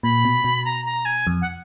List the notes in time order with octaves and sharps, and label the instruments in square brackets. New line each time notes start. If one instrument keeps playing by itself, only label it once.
[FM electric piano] A#2 [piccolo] B5
[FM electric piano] B2
B2
[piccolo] A#5
A#5
G#5
[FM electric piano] F2
[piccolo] F#5